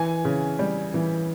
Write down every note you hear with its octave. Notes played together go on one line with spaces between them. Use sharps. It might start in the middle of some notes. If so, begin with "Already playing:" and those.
Already playing: E3 G#5
C#3
G3
E3